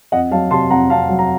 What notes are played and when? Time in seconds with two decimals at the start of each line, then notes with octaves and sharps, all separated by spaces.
0.12 F2 D#5 F#5
0.31 F#3 F5 A5
0.51 C3 A5 C6
0.70 F2 F#5 A#5
0.90 F2 F5 A5
1.09 F#3
1.19 A#5